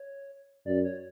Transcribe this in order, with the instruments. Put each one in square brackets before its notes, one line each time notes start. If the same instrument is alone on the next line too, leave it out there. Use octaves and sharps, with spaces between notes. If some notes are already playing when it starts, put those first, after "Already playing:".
Already playing: [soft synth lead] C#5
[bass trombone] F#2 [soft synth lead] D5
[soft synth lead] C#5